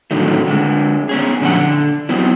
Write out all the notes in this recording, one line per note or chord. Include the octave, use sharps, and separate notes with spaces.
A2 D3 D#3 F#3 A3
D3 G#3
B3 C#4 G#4
A#2 D3 F3 A3 A#4 F#5
D3
F#3 B3 C4 E4